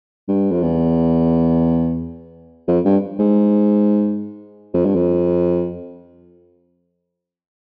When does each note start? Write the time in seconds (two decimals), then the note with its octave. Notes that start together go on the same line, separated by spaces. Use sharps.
0.28 G2
0.52 F2
0.63 E2
2.68 F2
2.85 G2
3.19 G#2
4.74 F2
4.85 G2
4.96 F2